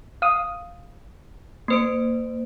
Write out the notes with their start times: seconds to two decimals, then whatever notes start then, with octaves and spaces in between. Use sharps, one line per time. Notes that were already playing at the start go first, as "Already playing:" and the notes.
0.22 F5 D#6
1.68 A#3 C5 D7